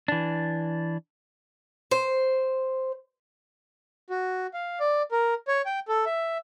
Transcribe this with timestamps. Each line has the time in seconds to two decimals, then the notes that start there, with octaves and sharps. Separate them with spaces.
0.08 E3 D4
1.91 C5
4.10 F#4
4.54 F5
4.80 D5
5.11 A#4
5.48 C#5
5.66 G5
5.88 A4
6.06 E5